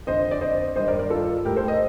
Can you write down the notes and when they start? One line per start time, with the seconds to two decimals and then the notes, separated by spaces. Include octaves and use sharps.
0.07 F2 D3 C5 D#5
0.31 D5
0.41 C5 D#5
0.76 G2 D#3 C5 D#5
0.88 A#4 D5
0.99 A#4 D5
1.10 F4 A4
1.45 A2 G4 A#4
1.56 A4 C5
1.68 C5 D#5